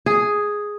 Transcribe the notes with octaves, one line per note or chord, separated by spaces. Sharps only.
G#4